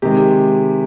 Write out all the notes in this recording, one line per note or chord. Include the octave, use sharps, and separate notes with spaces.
C3 D#3 G#3 G4